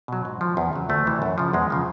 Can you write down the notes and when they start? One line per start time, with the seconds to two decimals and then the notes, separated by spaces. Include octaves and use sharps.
0.08 B2 F#3
0.25 G#2
0.41 F3
0.57 E2
0.73 C#3 F#3
0.89 D2 A3
1.06 C3 E3
1.22 F#2
1.38 C#3 F3
1.53 E2 G#3
1.70 C#3 F3